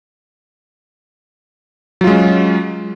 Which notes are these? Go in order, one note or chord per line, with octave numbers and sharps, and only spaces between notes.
F#3 G#3 C#4 F4